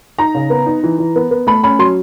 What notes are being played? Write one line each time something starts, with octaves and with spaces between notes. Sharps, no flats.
D#4 A#5
C#3
B3
D#4
E3
E3
B3
B3
A3 B5
C#4 B5
F#3 C6